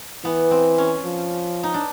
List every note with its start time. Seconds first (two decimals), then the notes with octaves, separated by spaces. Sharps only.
0.25 E3 B3
0.51 C4
0.78 C#4
1.05 F3
1.63 D#4
1.74 D4